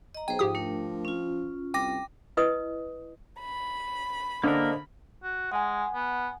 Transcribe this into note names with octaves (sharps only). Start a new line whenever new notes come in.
D#5 A#5
B1 G#4 C5 G5
G#2 F3 G4 D#6
A3 D4 A#4
C#4 F4
C2 G5 D6 A#6
E4 B4 D#5 D#6
B5
D3 A#3 D4 A#4 C5 D#5
F#4
G#3 F#5 G#5
B3